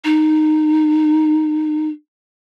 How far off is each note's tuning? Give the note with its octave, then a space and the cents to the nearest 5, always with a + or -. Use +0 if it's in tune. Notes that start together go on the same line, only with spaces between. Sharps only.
D#4 -15